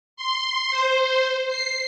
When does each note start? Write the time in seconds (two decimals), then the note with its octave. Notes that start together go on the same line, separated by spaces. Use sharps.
0.17 C6
0.71 C5
1.48 C7